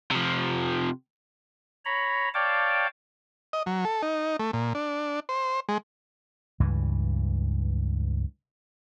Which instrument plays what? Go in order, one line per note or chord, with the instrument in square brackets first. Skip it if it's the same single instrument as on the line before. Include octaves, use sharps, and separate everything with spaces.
[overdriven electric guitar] C3 F3
[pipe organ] C#5 A#5 B5
C#5 D5 F5 G5 A5 D6
[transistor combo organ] D#5
F#3
A4
D#4
A3
A#2
D4
C5
G#3
[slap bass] C#2 G2 E3